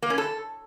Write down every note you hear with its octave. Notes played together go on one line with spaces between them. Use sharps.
A#3
C#4
A4